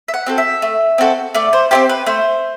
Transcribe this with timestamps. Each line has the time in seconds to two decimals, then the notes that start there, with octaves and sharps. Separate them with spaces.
0.08 E5
0.14 F#5
0.27 C4 F#4 A4
0.38 E5
0.62 A3
0.98 C4 F#4 A4
1.34 A3 D5
1.53 C5
1.71 C4 E4 G4 C5
1.89 B4
2.06 A3 C5